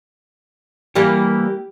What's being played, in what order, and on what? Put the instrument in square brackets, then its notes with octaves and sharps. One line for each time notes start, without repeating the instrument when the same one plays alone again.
[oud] E3 G3 A#3 [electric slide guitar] G4